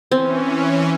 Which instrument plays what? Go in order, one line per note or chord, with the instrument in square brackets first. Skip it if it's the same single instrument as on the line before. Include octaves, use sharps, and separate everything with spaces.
[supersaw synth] E3 C#4 [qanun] C4